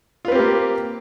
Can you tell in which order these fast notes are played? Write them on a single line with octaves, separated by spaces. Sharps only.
F4 B4 C4 G4 A#3